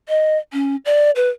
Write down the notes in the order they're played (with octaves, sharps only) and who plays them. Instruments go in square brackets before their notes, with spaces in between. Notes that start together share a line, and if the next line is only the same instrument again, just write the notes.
[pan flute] D#5
C#4
D5
B4